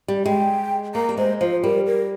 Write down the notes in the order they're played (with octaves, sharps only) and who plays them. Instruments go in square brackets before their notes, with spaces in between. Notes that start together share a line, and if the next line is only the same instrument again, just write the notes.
[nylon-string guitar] G3
[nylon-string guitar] G#3 [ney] G5
[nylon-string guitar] A#3 [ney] A#5
[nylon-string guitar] G3
[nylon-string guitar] G#3 [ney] C5
[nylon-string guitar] F3 [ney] C5
[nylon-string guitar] G3 [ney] A#4
[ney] A#4